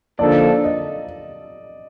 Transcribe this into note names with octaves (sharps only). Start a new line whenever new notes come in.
D3 F3 A#3 D#4 A4 D5
D#5